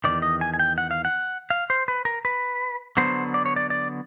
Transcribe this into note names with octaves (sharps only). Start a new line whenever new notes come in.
E2 C3 D#3 D5
D#5
G#5
G#5
G5
F#5
F5
F#5
F5
C5
B4
A#4
B4
D3 F#3 B3 C5
D5
C#5
D5
D5